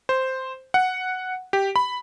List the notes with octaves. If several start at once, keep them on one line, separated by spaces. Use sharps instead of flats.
C5
F#5
G4
B5